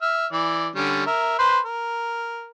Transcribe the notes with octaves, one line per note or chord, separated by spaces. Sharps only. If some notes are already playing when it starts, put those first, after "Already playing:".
E5 F6
E3 D5
D3 G3 C#4
A#4 E5
B4 C5 C6
A#4